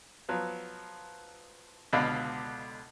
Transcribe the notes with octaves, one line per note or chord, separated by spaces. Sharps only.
F3 F#3 B3
C#2 B2 D3 A4 F5 B5